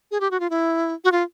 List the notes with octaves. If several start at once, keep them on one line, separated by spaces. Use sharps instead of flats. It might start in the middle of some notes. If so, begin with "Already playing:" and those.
G#4
G4
F#4
F4
E4
F#4
F4